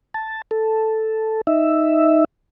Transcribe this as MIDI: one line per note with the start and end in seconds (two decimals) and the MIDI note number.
0.14 0.42 81
0.51 1.41 69
1.47 2.25 63
1.47 2.25 76